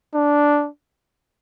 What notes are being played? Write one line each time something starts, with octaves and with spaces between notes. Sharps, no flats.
D4